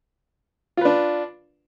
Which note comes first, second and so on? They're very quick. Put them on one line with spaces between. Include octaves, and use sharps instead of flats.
F4 B4 D4